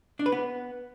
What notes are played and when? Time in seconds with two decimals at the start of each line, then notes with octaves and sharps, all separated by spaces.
0.19 D4
0.26 B4
0.32 B3